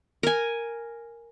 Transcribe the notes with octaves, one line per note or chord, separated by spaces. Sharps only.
A#4 G#5